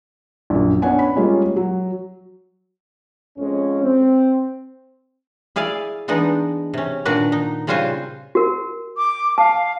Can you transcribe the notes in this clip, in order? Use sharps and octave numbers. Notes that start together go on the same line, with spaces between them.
A#1 F#2
B3 C#4 D4 F#5 G#5
B5
G3 G#3 A#3 C#4 F4
F#3
F2 G#3 C#4
C4
E4 G#4 D5 F5
E3 G#3 B3 D4 D#4
C3 C#4
A#2 D#3 D4 F#4 B4 D5
D#4
C#3 G3 F4 F#4 C5 G#5
F#4 A#4
D6
F5 A5